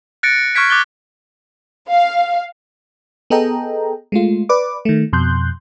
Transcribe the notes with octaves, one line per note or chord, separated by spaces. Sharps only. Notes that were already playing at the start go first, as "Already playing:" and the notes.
F#6 A6 A#6 C#7 D7
C#6 F6 F#6 G#6 B6 D7
D6 F#6 A6 G7
F5
B3 G#4 A4 D#5 G5 A#5
G#3 A3 F4
B4 D5 D6
D#3 A3
F2 B2 C6 F#6 G6